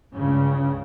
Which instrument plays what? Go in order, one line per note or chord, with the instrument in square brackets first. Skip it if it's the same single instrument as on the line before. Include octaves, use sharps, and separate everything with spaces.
[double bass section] C#2 G2 C#3